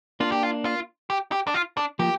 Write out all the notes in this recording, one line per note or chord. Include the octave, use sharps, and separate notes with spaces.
A#3 D4 F4
G4
F4
F4
G4
G4
D4
F4
D4
F3 A#3 G4